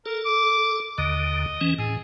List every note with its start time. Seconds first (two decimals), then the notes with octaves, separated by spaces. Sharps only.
0.06 A4 A#4
0.25 D6
0.98 D#2 D3 D#5
1.61 E3 C#4
1.79 A2 G#4